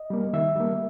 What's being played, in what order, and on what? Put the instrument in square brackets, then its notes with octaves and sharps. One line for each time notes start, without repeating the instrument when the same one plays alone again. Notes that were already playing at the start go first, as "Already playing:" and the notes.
Already playing: [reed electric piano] D#5
G3 A#3
D#3 E5
G3 A#3